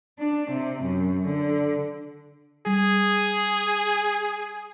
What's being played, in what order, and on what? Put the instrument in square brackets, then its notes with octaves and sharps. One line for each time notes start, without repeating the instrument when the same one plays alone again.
[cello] D4
C3
F#2
D3
[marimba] G3 [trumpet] G#4